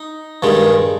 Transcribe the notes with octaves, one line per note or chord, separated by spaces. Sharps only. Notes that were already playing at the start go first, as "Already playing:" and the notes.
Already playing: D#4
G2 D#3 G#3